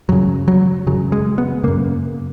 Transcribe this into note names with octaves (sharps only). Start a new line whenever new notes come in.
F#2 C#3 F#3
F#3
F#2 C#3 F#3
G#3
B3
F#2 C#3 A#3